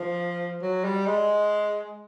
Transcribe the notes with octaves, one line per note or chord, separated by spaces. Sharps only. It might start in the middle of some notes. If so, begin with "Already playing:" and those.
Already playing: F3
F#3
G3
G#3